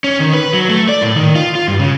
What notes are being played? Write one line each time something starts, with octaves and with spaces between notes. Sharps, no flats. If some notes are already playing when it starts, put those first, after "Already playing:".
C#4
D#3
B4
F#3
A3
D5
A2
D#3
F4
F4
G2
C#3